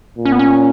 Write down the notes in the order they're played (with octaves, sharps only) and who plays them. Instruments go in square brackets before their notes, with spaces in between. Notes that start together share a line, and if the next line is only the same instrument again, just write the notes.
[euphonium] A#2
[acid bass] C#4
B3
C#4